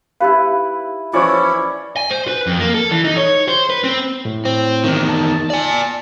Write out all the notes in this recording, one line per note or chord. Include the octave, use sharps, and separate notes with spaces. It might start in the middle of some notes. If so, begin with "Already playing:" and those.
D#4 E4 G4 B4 F5
E3 F3 C#4 E4 C#5 D5
G#5
C5
B4
F2
A#3
A4
E3
D#4
C#5
C5
B4
C4
A2
C4
E2 D#3
A5
D5 G#5